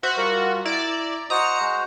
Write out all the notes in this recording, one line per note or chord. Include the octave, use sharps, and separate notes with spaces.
F#4 C5 E5
G3 F4 A#4
E4 D5 A#5
F#4 C5 D#5 A#5 C#7
G#3